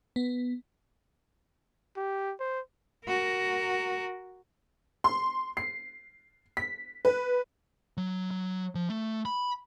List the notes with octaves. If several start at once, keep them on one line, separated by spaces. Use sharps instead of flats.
B3
G4
C5
F#4 A#4
C6
C7
B6
B4
F#3
F#3
F3
A3
B5